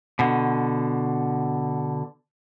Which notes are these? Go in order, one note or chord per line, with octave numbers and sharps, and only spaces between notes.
B2 D3